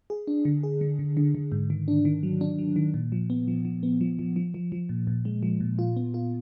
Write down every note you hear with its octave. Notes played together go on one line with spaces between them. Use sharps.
G#4
D4
D3
G#4
D3
D3
D3
D3
G#2
D#3
D4
D#3
F#3
D4
F#3
D#3
A#2
F3
B3
F3
F3
B3
F3
F3
F3
F3
F3
A#2
A#2
G#3
F3
A#2
F4
B3
F4